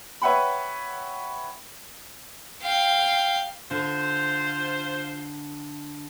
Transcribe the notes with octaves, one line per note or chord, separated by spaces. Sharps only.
B4 C#5 E5 F#5 G5 B5
F5 G5
D3 F4 C5